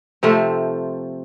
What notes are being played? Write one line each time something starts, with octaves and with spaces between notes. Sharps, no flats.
C3 F3 A3 C4